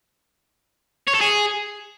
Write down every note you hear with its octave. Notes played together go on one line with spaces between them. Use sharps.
C#5
A4
G#4